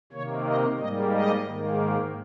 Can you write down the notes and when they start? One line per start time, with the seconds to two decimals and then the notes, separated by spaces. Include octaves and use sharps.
0.13 C3 D#3 A#3 C#5
0.46 D#5
0.78 G#2 G3 A#3 D#5
1.11 D#5
1.45 G#2 D#3 A#3